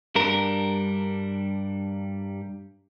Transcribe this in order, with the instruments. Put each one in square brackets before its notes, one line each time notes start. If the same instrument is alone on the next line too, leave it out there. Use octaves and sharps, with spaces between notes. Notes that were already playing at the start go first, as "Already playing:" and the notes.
[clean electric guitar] G2 G3 D4 A#4